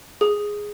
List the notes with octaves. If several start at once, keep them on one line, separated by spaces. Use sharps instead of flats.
G#4